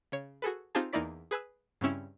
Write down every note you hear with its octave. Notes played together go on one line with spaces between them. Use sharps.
C#3 C#5
F#4 G#4 A4 B4
C4 D#4 F4 G4 G#4 A5
E2 A#3 D#4 E4 D5 B6
G#4 B4 G#5 E6
G2 C#3 C4 C#4 E4